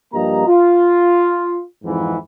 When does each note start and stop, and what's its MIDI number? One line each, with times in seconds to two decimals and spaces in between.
0.14 0.46 43
0.14 0.46 53
0.14 0.46 58
0.14 0.46 67
0.14 0.46 75
0.14 0.46 82
0.48 1.60 65
1.85 2.15 41
1.85 2.15 44
1.85 2.15 52